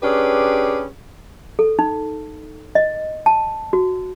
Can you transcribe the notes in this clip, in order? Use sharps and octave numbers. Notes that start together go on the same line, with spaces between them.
C#4 D4 G4 G#4 B4
A4
D#4
D#5
A5
F#4